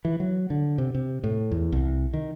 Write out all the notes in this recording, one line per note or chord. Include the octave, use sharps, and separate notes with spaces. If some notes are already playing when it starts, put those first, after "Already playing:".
E3
F#3
D3
C3
C3
A2
E2
C2
D#3